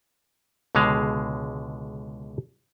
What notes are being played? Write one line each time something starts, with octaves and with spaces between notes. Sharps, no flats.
C#2 B2 D3 G#3 F5